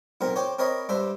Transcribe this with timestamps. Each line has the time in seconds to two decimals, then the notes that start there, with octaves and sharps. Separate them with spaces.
0.21 B1 A#2 C4 A#4
0.36 C5 C#5 G5 D6
0.59 C4 A#4 C#5 D#5 B5
0.89 G2 D4 C5 E5